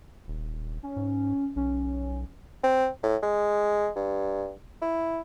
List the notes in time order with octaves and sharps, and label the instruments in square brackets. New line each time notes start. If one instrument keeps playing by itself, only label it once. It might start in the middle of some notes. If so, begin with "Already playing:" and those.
[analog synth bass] D#1
[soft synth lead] C#4
[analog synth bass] G#2
[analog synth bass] B1 [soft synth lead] C#4
[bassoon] C4
A2
G#3
G2
E4